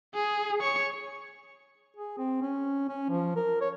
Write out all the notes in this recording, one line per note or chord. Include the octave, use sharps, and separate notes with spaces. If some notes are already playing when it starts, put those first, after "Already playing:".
G#4
C#5 C#6
G#4
C4
C#4
C#4
F3
A#4
C#5